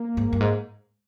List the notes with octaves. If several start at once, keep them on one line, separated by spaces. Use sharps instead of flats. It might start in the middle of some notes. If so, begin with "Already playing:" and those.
Already playing: A#3
G#2
G2
G#2